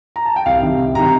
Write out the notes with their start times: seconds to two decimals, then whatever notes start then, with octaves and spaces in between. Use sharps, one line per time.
0.16 A#5
0.26 A5
0.36 G5
0.46 C2 F5
0.62 C3 D#3
0.78 C2
0.95 C3 D#3 A#5